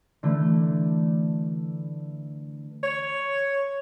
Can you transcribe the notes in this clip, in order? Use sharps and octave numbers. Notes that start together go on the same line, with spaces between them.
D3 E3 A3
C#5